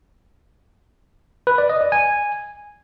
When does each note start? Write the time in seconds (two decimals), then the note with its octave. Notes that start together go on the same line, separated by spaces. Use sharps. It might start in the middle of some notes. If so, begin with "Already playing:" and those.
1.47 B4
1.58 D5
1.70 D#5
1.81 D5
1.92 G#5